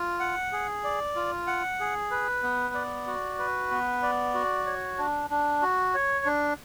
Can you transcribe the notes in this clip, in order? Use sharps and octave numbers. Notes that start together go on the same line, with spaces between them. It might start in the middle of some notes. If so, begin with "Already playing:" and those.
Already playing: F4
F#5
G#4
D5
F4
F#5
G#4
B4
B3
D5
F#4
B4
B3
D5
F#4
C#5
D4
D4
F#4
C#5
D4